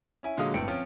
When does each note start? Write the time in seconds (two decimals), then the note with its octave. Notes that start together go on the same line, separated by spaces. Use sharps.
0.23 C#4 E4 G#5
0.37 A#2 D3 F#3 G#3 F5 D#6
0.54 G1 A2 C4 G5 C#7 D7
0.68 F3 C4 C#4 F4